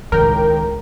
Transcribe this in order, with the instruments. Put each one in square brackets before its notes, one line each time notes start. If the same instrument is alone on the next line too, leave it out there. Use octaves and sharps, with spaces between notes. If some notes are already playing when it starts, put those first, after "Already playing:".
[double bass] C#2 A2 [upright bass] D#3 [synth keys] A#4 G5